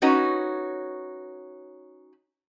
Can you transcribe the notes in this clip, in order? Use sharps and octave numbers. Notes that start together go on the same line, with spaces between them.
C#4 D#4 F#4 B4 C#5